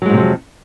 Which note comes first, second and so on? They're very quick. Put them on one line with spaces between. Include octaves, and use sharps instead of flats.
F#3 G#3 G#2 C3 F2